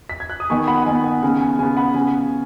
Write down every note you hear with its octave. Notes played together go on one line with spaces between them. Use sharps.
B6
G#6
F#6
D#6
D#3 B3 G#5 C#6
F#5 B5
F#5
D#3 B3 G#5
F#5
C#3 B3 G#5
G#5
C#3 B3 G#5
F#5 B5
C#3 B3 G#5